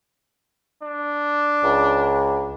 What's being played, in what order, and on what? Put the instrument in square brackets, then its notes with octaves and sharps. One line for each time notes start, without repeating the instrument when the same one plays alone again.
[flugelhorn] D4
[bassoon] C#2